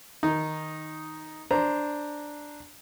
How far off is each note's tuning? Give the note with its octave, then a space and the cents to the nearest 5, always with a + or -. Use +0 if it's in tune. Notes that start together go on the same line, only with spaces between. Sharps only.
D#3 +0 D#4 +0
D4 +0 C5 +0 A#5 +0